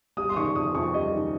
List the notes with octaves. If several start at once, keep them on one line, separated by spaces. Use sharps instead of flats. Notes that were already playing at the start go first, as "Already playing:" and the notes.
G3 D#6
C6
D#3 C#6
F2 D#6
F2 C#6
G3 D#5
D#3